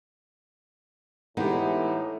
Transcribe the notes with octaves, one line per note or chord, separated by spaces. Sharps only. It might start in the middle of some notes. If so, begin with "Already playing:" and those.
A2 E3 G#3 B3 D#4 G4